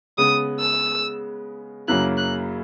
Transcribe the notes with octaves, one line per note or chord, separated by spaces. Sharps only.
C#3 G#3 B3 D#6
E6
F#2 C#3 F#3 A#3 E4 F#6
F#6